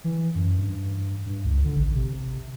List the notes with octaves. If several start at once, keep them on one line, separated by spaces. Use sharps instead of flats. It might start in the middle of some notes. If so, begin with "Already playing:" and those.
E3
F#2
G2
G2
C#2
D3
A1
C3